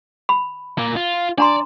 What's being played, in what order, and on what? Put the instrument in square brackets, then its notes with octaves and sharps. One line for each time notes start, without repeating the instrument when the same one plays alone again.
[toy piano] B5
[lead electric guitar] A#2 A#3
F4
[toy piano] D4 A#5 C6 [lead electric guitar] D5